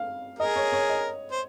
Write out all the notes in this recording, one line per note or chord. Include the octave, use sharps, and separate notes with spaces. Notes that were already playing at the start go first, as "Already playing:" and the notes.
Already playing: F5
G#4 A#4 D#5
C#5
C#5
D#5
C5